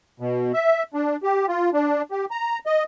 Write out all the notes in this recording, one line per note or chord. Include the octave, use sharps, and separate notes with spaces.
B2
E5
D4
G4
F4
D4
G4
A#5
D#5